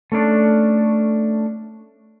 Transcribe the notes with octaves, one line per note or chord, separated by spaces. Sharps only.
A3 C#4 D4 A4